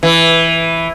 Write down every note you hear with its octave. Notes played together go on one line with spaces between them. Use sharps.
E3